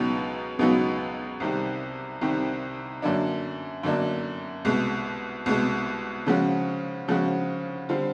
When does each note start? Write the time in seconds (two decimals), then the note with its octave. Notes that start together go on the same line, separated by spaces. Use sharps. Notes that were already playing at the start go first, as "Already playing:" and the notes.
Already playing: C#2 B2 F#3 B3 D#4
0.59 C#2 B2 F#3 B3 D#4
1.40 C2 C3 D#3 G3
2.21 C2 C3 D#3 G3
3.02 F#2 D3 F#3 A#3 D4
3.83 F#2 D3 F#3 A#3 D4
4.65 C2 B2 G#3
5.46 C2 B2 G#3
6.26 C#3 F3 G#3 C#4 F#4
7.08 C#3 F3 G#3 C#4 F#4
7.89 D3 G3 C4 F4